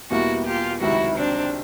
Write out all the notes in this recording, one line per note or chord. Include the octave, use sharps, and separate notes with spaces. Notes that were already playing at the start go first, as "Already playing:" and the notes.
E2 B2 G3 A#3 E4 F#4
F4 G4
C#2 C3 D#3 F#3 E4 F#4
C4 D4